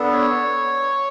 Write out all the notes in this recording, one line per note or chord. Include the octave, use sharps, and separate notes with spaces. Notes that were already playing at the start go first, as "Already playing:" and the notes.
Already playing: B3 D4 A4
C#5